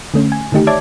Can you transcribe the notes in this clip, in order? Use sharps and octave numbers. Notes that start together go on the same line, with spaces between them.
D3 A3 C#4
G#5
D3 D#3 A3 D#4 G4
C#5 D5 E5 A5 D6 G#6